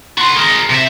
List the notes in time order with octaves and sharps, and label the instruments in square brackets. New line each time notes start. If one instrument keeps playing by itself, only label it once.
[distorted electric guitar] F#4 C6
G#4 A#4
C3 E5